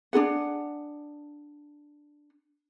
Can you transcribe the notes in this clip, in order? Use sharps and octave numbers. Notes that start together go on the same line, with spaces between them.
D4 F4 G#4 F#5